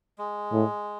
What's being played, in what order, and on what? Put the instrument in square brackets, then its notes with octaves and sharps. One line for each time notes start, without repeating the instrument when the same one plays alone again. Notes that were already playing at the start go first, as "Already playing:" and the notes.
[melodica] G#3
[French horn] A2